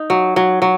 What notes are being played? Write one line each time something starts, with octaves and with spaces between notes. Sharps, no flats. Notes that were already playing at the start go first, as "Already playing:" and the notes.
Already playing: D#4
F#3
F#3
F#3